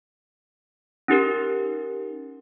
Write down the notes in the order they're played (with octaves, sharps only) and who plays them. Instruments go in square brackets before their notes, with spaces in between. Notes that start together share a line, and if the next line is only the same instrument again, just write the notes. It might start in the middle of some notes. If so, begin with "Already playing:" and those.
[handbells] C#4 D#4 G4 A#4